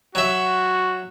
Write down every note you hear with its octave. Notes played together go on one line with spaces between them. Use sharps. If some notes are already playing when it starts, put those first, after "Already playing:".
F#3 F#4 E5